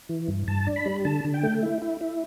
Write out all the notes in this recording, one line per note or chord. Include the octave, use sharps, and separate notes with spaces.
E3
G2
G2 A5
D4
B5
G3
D3 A5
D3
G5
A3
E4
E4
E4